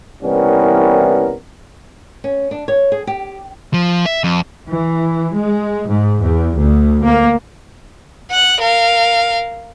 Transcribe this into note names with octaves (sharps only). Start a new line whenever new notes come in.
C2 E3 G3 B3 C#4 A#4
C#4
D4
C#5
G#4
G4
F3
E5
F2
E3
G#3
G#2
E2
D2
A#3
F#5 F#6
A#4 F5